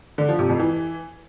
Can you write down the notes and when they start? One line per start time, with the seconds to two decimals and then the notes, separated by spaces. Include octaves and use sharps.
0.18 D3
0.28 F3
0.39 C3
0.49 F2
0.59 E3